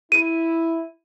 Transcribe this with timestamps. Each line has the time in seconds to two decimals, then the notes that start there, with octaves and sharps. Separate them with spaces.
0.12 E4 D#7